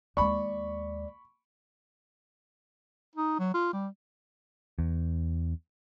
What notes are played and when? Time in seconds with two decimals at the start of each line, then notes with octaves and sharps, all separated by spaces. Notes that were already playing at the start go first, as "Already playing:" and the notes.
0.17 D#2 G#3 D5 B5 C#6
3.15 D#4
3.39 F#3
3.54 F4
3.73 G3
4.79 E2